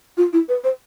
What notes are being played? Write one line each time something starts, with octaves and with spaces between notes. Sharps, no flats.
F4
E4
B4
C5